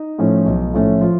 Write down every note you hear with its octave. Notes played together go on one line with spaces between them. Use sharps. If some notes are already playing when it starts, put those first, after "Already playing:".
Already playing: D#4
A2 F3 A3 C#4
B1
A2 F3 A3 C#4
F3 F4